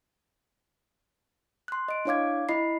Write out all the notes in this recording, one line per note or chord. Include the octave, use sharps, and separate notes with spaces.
C6 F#6
D#5 D7
D4 E4 C#5 F5 D6 G#6
E4 D#5 B5 C7